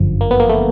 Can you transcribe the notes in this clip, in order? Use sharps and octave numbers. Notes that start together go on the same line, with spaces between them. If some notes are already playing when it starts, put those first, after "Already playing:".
Already playing: G1 F#2 D3 F3
A#3
B3
A#3
A3